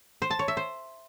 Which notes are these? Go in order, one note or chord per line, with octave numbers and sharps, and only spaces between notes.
C5
A5
C#5
E5
C5